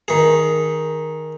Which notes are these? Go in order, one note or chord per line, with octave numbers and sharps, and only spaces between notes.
D#3 G#4